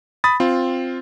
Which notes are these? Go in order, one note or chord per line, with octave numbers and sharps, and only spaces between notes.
B5 D#6 A6
C4 F4